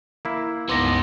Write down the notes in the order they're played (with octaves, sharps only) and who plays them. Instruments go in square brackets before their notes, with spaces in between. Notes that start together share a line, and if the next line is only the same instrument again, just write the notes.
[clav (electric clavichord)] A#3 E4
[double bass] C#2 G2 [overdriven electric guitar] B3 D#4 [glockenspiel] C6 D6 A#6